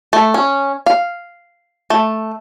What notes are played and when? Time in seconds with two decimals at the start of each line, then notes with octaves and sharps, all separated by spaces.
0.13 A3
0.34 C#4
0.86 F5
1.90 A3